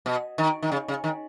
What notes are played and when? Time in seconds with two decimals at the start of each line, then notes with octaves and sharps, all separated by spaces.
0.06 B2
0.38 D#3
0.62 D#3
0.72 C#3
0.88 C#3
1.04 D#3